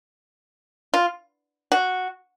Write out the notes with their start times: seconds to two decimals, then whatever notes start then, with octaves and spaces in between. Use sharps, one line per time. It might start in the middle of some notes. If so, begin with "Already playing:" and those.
0.94 F4
1.72 F#4